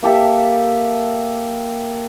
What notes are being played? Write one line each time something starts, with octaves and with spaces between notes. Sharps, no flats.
A#3 G4 A4 E5